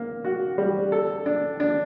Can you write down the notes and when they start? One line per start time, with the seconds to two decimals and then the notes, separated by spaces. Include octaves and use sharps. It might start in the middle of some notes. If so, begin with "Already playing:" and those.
Already playing: A#3
0.24 F#4
0.58 G3
0.92 A4
1.26 D4
1.60 D4